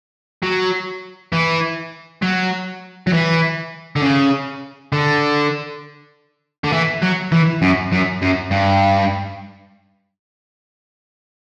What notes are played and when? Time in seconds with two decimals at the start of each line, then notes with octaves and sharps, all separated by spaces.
0.43 F#3
1.32 E3
2.23 F#3
3.07 F#3
3.13 E3
3.96 D3
4.02 C#3
4.93 D3
6.64 D3
6.72 E3
7.02 F#3
7.32 E3
7.62 F#2
7.92 F#2
8.22 F#2
8.51 G2